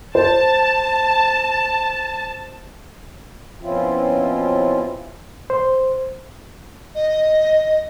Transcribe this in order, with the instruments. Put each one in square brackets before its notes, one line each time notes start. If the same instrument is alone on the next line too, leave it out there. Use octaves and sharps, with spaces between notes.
[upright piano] C5 [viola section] A5
[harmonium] B2 F3 C4 C#4 E4 F4
[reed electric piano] C5
[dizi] D#5